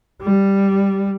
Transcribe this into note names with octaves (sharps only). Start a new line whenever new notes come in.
G3